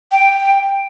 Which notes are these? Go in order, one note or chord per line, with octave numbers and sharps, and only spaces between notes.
G5